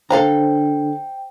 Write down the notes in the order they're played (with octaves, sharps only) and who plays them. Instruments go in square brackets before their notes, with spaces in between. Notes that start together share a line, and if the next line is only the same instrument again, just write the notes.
[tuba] D3 [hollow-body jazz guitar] A4 F5 A#5 [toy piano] C5 [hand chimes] G5